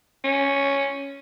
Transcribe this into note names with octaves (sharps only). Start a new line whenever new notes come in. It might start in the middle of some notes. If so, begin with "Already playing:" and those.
C#4